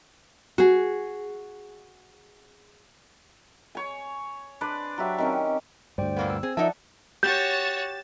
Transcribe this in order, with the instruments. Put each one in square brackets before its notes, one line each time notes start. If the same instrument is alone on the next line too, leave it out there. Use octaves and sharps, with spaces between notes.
[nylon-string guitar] F#4 G#4
[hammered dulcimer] C#5 G#5
D4 B4 C5 D5
F#3 G4 E5
D#3 C4 C#4
[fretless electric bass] D2 G2 [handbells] C5 D5 G5
[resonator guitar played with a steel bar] A#2 A#3 B3
[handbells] E6
[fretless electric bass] C4 [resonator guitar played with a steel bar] G#4
[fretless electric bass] F3 [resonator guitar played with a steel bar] D#4 A#4 E5 [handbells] D5 F#5 A5
[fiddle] F#4 C#5 [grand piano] G4 [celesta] G6 [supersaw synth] A6 E7